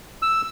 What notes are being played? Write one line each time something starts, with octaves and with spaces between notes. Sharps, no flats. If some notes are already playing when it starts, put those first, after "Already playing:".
E6